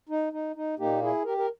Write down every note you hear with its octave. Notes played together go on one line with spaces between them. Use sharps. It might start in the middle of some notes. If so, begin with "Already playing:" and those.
D#4
D#4
D#4
A#2 A#3 D#4 G4
E4 G#4
G4 A#4
A#4